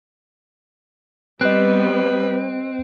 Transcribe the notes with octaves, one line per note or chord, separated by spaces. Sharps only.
G3 B3 C4 B4 D#5 F#6